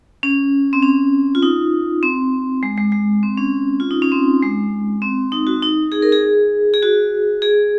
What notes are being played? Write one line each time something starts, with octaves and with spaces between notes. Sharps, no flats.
C#4
C4
C#4
F4
D#4
C4
G#3
G#3
G#3
C4
C#4
F4
D#4
C#4
C4
G#3
C4
D#4
F#4
D#4
G#4
A#4
G#4
G#4
F#4
G#4